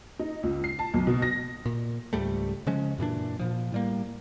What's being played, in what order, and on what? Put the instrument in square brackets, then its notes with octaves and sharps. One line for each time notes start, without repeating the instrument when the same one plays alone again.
[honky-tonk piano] D#4
C#2
C7
A5
B1
B2
A#6
[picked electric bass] A#2
C#2 G#2 G3 A3
C#3 F3 G#3 C#4
F#2 A#2 E3 D4
A#2 F3
A2 G3 A#3